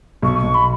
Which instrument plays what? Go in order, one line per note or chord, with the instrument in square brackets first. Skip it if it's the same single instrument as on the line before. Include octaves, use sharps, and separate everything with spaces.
[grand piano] B1 [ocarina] C#6
[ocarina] C#6
[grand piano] B1
[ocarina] B5